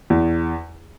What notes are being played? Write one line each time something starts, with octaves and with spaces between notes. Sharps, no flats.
E2